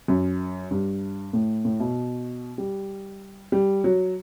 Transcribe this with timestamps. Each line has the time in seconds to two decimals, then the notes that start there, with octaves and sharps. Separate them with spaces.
0.08 F#2
0.71 G2
1.33 A2
1.65 A2
1.80 B2
2.58 G3
3.52 G3
3.84 F#3